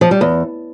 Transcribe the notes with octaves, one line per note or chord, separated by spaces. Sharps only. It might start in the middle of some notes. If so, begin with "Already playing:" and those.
F3
G3
E2